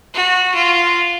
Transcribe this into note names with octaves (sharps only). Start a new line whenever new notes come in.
F#4
F4